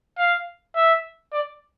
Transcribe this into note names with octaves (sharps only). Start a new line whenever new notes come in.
F5
E5
D5